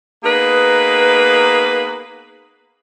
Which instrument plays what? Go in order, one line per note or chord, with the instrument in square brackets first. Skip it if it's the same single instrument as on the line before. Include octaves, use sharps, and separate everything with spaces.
[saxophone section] A#3 B3 D#4 G#4 B4